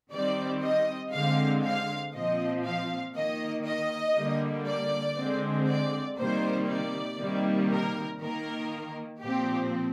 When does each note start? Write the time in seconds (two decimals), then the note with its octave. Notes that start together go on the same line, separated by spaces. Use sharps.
0.12 D#3 G3 C4 D5
0.62 D#5
1.12 D3 G#3 C4 F5
1.64 F5
2.14 A#2 F3 C4 D#5
2.64 F5
3.15 D#3 A#3 D#5
3.65 D#5
4.15 D3 G3 A#3
4.66 D5
5.17 D3 G#3 C4
5.68 D5
6.18 C3 D#3 G3 A#3 C5
6.68 D5
7.19 C3 D#3 G3 A#3
7.70 A#4
8.20 D#3 A#3 A#4
9.21 A#2 F3 C4 G4